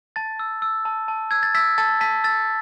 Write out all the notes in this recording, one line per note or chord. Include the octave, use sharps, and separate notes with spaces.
A5 A6
E6
E6
A5
A5
E6 G#6
A6
E6 B6
A5 A6
A5 B6
E6 A6